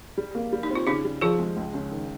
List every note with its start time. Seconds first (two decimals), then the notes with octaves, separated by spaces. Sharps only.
0.18 G3
0.35 A#3
0.53 G3
0.63 D#4
0.70 C4
0.75 F4
0.87 C#3 D#4 G4
1.05 G3
1.21 F3 F4 G#4
1.39 G#3
1.57 C#2
1.74 C#3
1.91 D#3